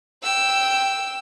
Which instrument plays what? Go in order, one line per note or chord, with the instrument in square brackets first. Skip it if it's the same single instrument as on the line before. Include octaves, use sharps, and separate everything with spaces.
[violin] G5 E6